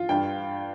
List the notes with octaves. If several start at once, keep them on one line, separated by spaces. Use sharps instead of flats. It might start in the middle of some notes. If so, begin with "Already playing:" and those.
Already playing: F4
G2 G5